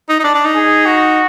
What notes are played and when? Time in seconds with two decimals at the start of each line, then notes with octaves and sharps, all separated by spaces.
0.09 D#4
0.20 D#4
0.24 D4
0.34 D4
0.45 D#4
0.55 G#4
0.85 F#4